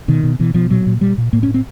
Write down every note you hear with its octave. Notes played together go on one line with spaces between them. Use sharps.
B2 D#3
B2
B2 E3
B2 F3
A#2 F#3
A#2
A#2 G3
A#2
A2 A#3
C#4
A2
C4